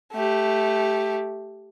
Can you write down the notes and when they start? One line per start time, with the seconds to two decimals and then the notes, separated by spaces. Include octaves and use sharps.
0.12 A3 G4